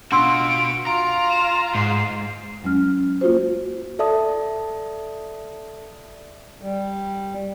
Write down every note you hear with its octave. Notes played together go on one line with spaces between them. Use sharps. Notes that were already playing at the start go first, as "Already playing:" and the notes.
B2 D4 F4 F#4 C6 E6 D7
F4 A#5
E7
G#2 C7
E2 F#3 G#3 C#4 F6
A#3 F4 F#4 C5
A4 D5 E5 A5 D#6
G3